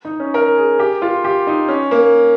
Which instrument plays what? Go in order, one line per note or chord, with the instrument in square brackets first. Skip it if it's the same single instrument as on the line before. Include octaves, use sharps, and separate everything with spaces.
[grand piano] D#4
C#4
A#4
G#4
G4
F4
G4
D#4
C#4
A#3